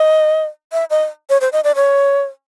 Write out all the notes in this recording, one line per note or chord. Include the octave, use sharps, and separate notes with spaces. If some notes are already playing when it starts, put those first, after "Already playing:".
Already playing: D#5
E5
D#5
C#5
C5
D#5
D5
C#5